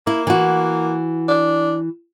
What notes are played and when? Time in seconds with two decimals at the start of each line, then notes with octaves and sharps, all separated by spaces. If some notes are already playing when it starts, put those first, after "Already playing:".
0.07 A#3 E4
0.27 E3 F#4
1.29 D4